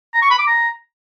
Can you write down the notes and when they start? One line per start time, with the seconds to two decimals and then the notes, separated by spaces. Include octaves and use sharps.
0.14 A#5
0.22 C#6
0.30 B5
0.39 D6
0.47 A#5